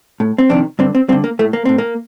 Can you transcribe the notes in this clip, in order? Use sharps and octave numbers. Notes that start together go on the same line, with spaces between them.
A2
C4
F2 C3 D#3 D4
G2 D3 C4
C4
G2 D3 C4
A#3
A2 A3
A#3
A2 C4
A#3